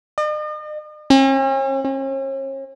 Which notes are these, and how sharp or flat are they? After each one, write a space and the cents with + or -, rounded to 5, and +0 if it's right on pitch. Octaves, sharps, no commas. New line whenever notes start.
D#5 -45
C#4 -45
C#4 -40